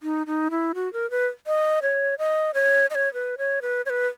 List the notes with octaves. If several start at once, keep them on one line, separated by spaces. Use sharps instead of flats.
D#4
D#4
E4
F#4
A#4
B4
D#5
C#5
D#5
C#5
D#5
C#5
B4
C#5
B4
C#5
B4